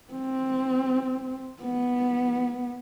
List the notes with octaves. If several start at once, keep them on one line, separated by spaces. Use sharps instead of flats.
C4
B3